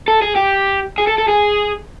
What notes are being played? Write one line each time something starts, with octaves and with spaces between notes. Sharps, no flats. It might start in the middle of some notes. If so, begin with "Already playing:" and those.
A4
G#4
G4
G#4
A4
A4
G#4